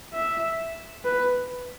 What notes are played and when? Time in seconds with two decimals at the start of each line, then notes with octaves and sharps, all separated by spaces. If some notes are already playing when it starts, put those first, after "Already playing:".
0.14 E5
1.04 B4